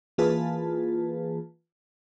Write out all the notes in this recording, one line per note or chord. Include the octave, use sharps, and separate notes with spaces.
E3 A#3 F4 G#4 B4 A5